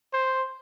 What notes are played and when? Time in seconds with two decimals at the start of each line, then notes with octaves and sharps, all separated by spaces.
0.13 C5